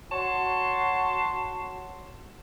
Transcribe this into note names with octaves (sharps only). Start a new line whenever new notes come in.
F#4 C#5 A5 C6